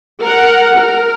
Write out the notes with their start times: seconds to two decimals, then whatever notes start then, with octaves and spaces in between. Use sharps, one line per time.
0.22 A#4 F#5
0.75 A#4